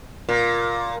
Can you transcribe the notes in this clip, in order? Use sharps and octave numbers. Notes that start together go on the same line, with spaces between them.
A#2